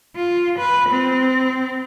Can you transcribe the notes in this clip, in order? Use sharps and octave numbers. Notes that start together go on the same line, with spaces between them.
F4
B4
C4